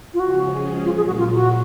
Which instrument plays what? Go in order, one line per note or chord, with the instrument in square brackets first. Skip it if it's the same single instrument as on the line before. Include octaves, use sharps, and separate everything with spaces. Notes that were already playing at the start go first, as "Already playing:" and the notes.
[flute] F4
[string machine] C#3 F3 G#3 C#4 G#4 [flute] F#4
[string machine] A#2 F#3 A#3 [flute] F4
[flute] G#4
F#4
F4
F#4